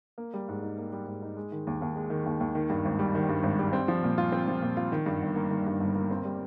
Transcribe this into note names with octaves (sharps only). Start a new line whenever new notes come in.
A#3
G3
G#2
D#4
A#3
G3
G#2
D#4
G#3
D#3
D#2
D#2
G#3
D#3
D#2
D#2
D#3
G2
G#1
G3
D#3
G2
G#1
G3
C4
F3
A#2
F4
C4
F3
A#2
F4
D#3
G2
G1
A#3
D#3
G2
G1
A#3
C4
G3